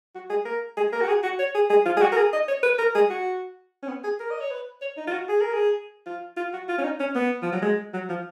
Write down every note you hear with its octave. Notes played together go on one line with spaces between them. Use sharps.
F#4
G#4
A#4
G#4
A#4
F#4
G#4
F#4
C#5
G#4
G#4
F4
G#4
F#4
A#4
G#4
D#5
C#5
B4
A#4
G#4
F#4
C#4
B3
G#4
A#4
D#5
C#5
B4
C#5
D#4
F4
F#4
G#4
A#4
G#4
F4
F4
F#4
F4
C#4
D#4
C#4
B3
F3
F#3
G#3
F#3
F3